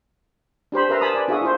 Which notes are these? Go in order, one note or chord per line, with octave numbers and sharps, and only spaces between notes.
D4 G4 C5 B5
A#4 B4 E5 A#5 C6
A#4 C5 G#5 A5 B5 D#6
B4 D5 G#5 A5 B5
D4 F#4 G#4 E5 F5 D#6
E4 F4 C5